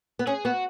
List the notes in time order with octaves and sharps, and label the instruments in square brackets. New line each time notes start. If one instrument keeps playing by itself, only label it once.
[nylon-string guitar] B3
[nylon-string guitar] C#4 [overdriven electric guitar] G#4
[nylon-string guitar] B3 [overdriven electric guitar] F#4